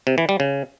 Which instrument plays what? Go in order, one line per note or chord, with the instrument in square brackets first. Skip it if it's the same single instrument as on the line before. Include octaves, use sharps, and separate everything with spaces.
[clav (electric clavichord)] C3
E3
G3
C#3